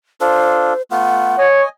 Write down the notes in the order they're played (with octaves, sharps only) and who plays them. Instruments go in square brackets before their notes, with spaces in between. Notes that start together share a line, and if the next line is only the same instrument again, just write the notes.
[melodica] D4 F4 A4 [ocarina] C5
[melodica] A3 B3 F4 [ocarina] F#5
[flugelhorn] C#5 [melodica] D#5 G#5